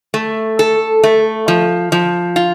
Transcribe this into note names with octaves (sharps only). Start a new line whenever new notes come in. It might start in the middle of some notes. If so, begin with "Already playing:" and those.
A3
A4
A3
F3
F3
F4